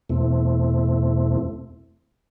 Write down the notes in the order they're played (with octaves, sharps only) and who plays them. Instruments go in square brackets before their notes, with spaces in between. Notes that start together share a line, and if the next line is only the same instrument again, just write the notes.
[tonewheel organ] E2 B2 A3 C4 E4